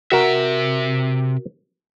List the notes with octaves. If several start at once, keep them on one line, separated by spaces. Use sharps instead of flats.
C3 F#4 A#4 E5